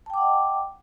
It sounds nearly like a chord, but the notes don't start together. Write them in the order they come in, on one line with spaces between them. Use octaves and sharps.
A5 G5 D6 F#5 D#5